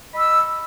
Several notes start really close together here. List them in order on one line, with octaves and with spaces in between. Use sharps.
D#5 B5 E6